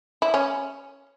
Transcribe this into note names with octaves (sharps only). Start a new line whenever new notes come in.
E4
C#4